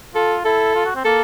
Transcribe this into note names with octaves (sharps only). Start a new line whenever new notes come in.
F4 A4
E4 A4
F4
F#4
C4
A#3 A4